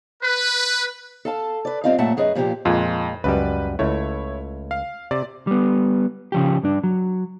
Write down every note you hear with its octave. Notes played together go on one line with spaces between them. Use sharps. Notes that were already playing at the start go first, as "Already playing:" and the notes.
B4
A4 F5 A5
B4 D5
G2 C3 C4 F4 D#5 F5
F#2 A#2 A3 E5 F#5 A5
F#2 G#4 B4 D#5
A#2 F3 A#3 E4 G4 A#4
F2 A#2 G#3 F4
C#2 F#2 G3 B4
C#2 A3 E4 C#5
F5
C3 D5
G3 B3
C#3 F3 G4
G2 D4
F#3